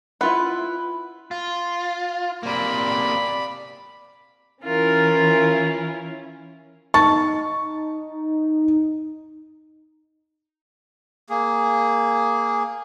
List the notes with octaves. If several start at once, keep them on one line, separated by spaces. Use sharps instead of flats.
E4 F4 B4 F#5
F4
C3 A#3 D5 B5
E3 C#4 E4 F4 A#4
D#4 A5 C#6
A#3 G#4